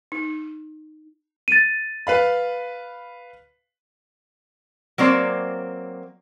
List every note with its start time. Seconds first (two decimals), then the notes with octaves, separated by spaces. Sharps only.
0.12 D#4
1.48 A6 D#7
2.07 B4 F5 B5
4.98 F#3 A#3 C4 D5